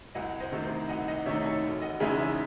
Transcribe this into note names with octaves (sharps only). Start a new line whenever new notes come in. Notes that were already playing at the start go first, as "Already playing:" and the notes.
C2 D#5 F#5
C5 D#5
C3 D#3 A3 D#4
C5
C2 D#5 F#5
D#5 F#5
C3 D#3 A3 D#4 C#5 E5
A4 C#5
E1
D#5 F#5
E2 C#3 G#3 D#4 E5 G#5
E5 G#5